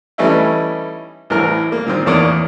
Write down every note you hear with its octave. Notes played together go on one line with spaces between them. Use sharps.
E3 G3 A3 C#4 D#4 E4
C2 A2 E3 A#4 F6
A#3
A#2 D#3 C4
A1 E2 A#3 C#5 D5 D#6